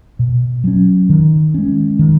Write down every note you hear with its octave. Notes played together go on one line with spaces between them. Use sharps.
B2
F#3 C#4
D#3
G#3 C#4
D#3